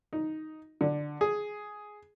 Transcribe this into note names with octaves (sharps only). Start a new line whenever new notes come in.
D#4
D3
G#4